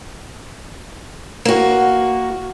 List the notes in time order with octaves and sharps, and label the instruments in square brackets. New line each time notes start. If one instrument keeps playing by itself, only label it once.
[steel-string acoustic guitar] A#3 F#4